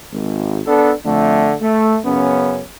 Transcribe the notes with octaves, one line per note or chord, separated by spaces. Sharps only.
G#1
B3 D4 A4
F2 D3 A3
A3
F#2 C#3 B3 C#4